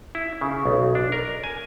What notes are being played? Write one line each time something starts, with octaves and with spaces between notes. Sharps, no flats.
E4
C#3
B1
D4
A#4
G#5